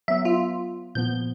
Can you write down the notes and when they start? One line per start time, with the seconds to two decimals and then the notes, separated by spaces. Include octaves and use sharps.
0.08 F#3 B3 E5
0.25 F4
0.95 A#2 F3 B3 G6